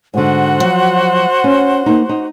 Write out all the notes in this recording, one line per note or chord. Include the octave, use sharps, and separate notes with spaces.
G#2 D3 F#4 C5 F#5
F3 F#3
C#4
A#3 D#4
D#4